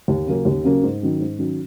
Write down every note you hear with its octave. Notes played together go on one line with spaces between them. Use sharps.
D#2
C#3 F#3 A#3 C#4
D#2
C#3 F#3 A#3 C#4
G#2
D#3 F#3 C#4
G#2
D#3 F#3 C#4